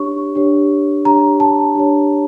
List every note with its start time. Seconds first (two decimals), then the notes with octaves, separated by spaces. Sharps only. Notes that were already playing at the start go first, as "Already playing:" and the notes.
Already playing: D4 G4 C#5 C#6
0.35 D4 G4 C#5
1.05 D4 G4 C#5 A#5
1.40 A5
1.75 D4 G4 C#5